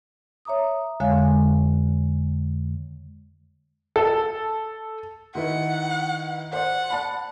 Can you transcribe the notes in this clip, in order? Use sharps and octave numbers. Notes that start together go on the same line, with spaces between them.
C#5 E5 A#5 D6 D#6
F2 D3 G#3 C#5 F5 G#5
A4
D#3 E4 B4 F#5
C5 D5 F#5
D5 A5 B5